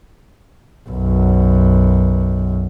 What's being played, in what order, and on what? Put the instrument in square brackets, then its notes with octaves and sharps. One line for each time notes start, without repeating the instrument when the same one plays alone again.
[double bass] B1 F#2